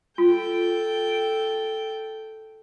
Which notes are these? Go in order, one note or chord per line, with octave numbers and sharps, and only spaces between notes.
F4 A4 G5